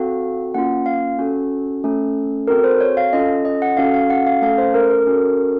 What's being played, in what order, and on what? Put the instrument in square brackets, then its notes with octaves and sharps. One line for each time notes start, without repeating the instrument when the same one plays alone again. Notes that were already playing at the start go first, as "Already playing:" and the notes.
Already playing: [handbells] C4 F#4 A4 F5
A#3 C#4 F4 F#5
F5
C#4 F#4 A4
A3 C#4 A4
C4 F#4 A4 A#4
C5
C#5
F5
C#4 F4 A4 D#5
D#5
F#5
C#4 F#4 A4 F5
F5
F#5
F5
A3 C#4 A4 F5
C5
A#4
A#4
C#4 F#4 A4